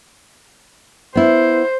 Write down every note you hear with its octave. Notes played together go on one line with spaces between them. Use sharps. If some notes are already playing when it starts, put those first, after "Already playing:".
B3 E4 C5